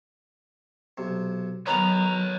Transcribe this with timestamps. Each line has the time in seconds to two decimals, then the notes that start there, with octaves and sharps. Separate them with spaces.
0.98 B1 C3
1.67 D#3 F#3 B3 B4 C#5 A#5